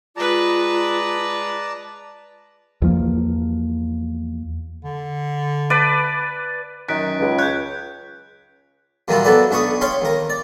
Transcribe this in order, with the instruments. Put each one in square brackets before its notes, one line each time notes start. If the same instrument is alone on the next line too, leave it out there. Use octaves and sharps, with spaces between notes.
[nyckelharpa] G#3 B4 [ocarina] F4 [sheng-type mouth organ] D5 A5 A#5
[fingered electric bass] E2 F3 A#3
[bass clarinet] D3
[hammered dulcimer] B4 D5 A5
[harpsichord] F#2 D#3 [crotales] F#6 B6 D7
[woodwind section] C#2
[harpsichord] C#5 [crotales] F#6 G6
[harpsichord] A#2 D#3 F#3 G3 E4 F4
B2 F#3 A4 B4 D5
B1 D4 B5 C#6 D#6
C#5 F5 G5 B5 C6
D#2 A#4
D5